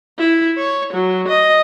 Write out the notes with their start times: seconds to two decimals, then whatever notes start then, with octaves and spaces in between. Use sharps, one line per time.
0.19 E4
0.58 C#5
0.93 F#3
1.28 D#5